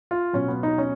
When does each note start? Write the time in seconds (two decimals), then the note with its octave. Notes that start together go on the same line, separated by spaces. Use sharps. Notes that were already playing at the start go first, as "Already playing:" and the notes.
0.11 F4
0.33 B2 F#3 C#4
0.48 B3
0.63 D#4
0.78 C#4